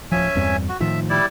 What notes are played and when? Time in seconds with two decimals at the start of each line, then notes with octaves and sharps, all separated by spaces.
0.12 D1 F3 C#4 E5 G#5
0.35 E2 G2 C4
0.69 F#4
0.80 A2 D#3 F3 E5
1.10 G3 E4 D5